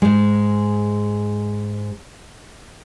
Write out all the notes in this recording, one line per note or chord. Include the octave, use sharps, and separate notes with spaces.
G#2 G#3